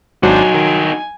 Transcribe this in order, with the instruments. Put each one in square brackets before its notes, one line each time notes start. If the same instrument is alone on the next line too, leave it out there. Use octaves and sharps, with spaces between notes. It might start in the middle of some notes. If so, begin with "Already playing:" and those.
[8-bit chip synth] G#1 D4 C5 [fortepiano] F#3 [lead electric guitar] D#4 F#4 [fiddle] G#5
[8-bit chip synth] D#3